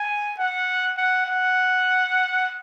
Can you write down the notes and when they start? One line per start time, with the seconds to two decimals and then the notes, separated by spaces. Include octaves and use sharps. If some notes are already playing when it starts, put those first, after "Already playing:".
Already playing: G#5
0.39 F#5
0.97 F#5
1.26 F#5